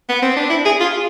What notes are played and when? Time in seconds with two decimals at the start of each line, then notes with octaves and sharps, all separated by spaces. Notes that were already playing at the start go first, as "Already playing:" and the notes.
0.09 B3
0.22 C4
0.37 D4
0.50 E4
0.65 G#4
0.80 F4